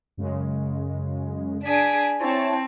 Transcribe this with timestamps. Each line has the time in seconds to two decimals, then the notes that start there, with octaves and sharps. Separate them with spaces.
0.17 F#2 C#3 G#3
1.63 D4 G#4 B6 D7 D#7
2.21 C4 E4 C#5 A5